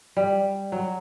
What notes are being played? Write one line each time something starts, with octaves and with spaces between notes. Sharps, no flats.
G3
F#3